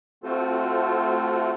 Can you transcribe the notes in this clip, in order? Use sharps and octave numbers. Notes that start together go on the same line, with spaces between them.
A3 C4 F4 F#4 A4 C5